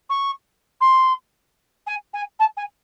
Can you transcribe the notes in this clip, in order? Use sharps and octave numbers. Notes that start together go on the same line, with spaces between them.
C#6
C6
G#5
G#5
A5
G#5